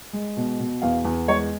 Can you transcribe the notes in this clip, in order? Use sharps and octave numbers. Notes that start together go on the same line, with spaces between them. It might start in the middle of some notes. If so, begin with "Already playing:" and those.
G#3
B2
B2
E2 F5
E2
G#3 C#5